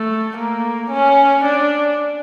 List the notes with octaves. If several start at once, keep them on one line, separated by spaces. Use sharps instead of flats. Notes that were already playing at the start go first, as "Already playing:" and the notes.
Already playing: A3
A#3
C#4
D4